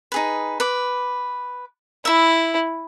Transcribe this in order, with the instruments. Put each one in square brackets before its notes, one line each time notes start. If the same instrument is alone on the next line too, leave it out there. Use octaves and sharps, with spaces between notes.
[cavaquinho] D#4 G#4 B4
B4 D6
[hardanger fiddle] E4 [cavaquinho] E5 B5